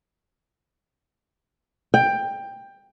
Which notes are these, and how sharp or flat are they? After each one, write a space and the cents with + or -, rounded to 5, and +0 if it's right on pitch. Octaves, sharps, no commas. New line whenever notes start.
G5 +15